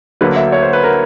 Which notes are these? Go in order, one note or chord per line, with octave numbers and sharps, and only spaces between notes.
D2 D3 F#3 A#3 B4
E5
C#5
C5
B4
A#4